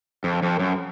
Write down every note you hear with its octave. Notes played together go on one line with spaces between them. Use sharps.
F2
F2
F#2